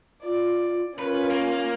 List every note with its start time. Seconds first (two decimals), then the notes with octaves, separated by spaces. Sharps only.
0.23 F4 D5
0.98 C#4 F4 A#4 B4
1.30 A#3